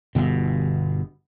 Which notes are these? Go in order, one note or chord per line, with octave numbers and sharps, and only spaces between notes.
G1 B2